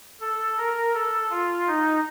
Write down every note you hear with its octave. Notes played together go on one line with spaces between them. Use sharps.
A4
A#4
A4
F4
D#4